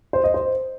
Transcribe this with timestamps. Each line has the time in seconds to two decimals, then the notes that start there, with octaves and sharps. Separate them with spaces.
0.13 C5
0.24 D#5
0.34 C5